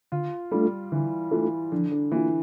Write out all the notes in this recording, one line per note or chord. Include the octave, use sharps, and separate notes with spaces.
D3 F4
G3 A3 D4 F4 A4
D3 E3
E3 A3 D4 F4 A4
D3 F3
D3
E3 A#3 F4